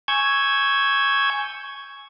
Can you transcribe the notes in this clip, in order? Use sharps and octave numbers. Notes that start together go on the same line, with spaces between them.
G#5 C#6 E6 G6 G#6